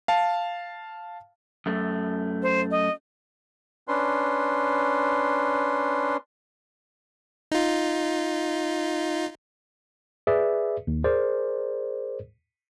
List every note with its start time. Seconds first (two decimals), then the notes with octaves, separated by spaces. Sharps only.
0.08 F5 A5
1.66 F#2 A3
2.43 C5
2.71 D#5
3.88 C#4 D4 B4 C6
7.52 D#4 F4
10.27 G#4 B4 D5 E5
10.87 D#2
11.04 G#4 A#4 C5 D5